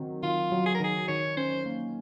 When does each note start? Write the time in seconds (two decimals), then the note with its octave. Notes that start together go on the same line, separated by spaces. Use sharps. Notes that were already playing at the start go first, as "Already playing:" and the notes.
Already playing: D#3 F#3 C4
0.23 D#3 F4
0.52 F#3
0.66 G#4
0.75 A#4
0.80 D#3 G#4
1.08 D#3 C#5
1.37 C#4 C5
1.66 A#3